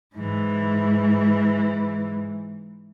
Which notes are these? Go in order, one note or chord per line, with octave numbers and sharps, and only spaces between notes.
G#2 E3